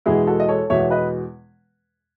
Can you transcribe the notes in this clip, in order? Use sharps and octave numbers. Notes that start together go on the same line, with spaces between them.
E2 B2 G#3 E4 G#4
F#4 A4
D#5
A4 C#5
E2 B2 G#3 C#5 E5
E5
B4 D#5